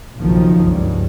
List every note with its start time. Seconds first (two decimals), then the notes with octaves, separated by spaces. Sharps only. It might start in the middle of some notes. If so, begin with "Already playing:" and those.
0.19 F#1 B1 D#3 F3
0.65 C#2 G2